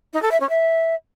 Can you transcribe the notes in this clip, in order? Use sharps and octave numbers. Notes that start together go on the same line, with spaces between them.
D#4
A4
E5
C#4
E5